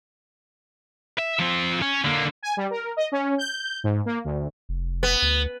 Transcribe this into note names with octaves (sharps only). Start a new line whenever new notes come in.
E5
F3 C4
C#4
D3 A#3
G#5
G3
A#4
D#5
C#4
G6
G#2
A#3
D2
F1
B3
D2